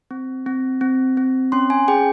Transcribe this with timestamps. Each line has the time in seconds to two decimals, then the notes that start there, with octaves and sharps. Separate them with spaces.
0.11 C4
0.46 C4
0.81 C4
1.17 C4
1.52 C#4 C6
1.70 G#5
1.88 G#4 G5